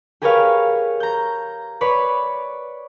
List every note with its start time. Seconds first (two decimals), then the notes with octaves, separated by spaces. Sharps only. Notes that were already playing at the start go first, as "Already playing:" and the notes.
0.22 G4 G#4 A#4 B4 C#5 F5
1.00 A#5 G6
1.81 B4 C#5 D5 B5